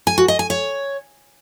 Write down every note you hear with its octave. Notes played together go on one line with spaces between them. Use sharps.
G#5
F#4
D#5
G#5
C#5